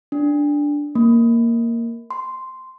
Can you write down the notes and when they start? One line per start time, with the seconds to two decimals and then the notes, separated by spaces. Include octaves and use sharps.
0.12 D4
0.95 A#3
2.11 C6